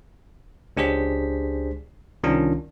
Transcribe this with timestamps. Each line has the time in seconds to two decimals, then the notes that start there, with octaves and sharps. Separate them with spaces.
0.77 C#2 D4 G4 G#4 C5 B6
2.23 C2 D#3 C#4 D4 F4